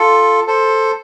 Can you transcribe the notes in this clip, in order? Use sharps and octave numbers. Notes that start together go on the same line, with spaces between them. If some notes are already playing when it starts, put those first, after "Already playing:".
Already playing: F4 A4
A4 C5